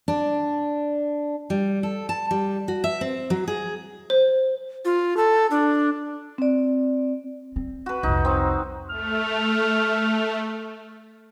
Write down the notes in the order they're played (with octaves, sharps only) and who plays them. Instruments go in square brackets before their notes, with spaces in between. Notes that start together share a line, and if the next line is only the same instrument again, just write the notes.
[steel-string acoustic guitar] D4
G3
A4
A5
G3
F#4
E5
C4
F#3
G#4
[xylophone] C5
[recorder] F4
A4
D4
[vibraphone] C4 D5
[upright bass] C4
[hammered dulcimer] F#4 B4
[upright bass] C2 F2 [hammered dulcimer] D#4
[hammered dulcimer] C4 D#4
[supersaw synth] A3 [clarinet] F6